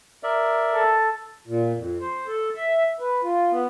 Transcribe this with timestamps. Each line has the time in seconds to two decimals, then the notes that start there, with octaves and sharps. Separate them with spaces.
0.23 A#4 D5 E5
0.74 A4
1.47 A#2
1.75 F2
2.01 C5
2.28 A4
2.55 E5
3.00 B4
3.23 F4
3.52 B3